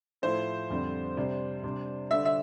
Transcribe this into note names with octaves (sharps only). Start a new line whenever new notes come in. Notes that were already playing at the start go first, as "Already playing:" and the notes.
A2 F3 A3 E4 C5
F2 D3 G3 C4
C3 G3 D4
C3 G3 D4
D3 G3 D4 E5
E5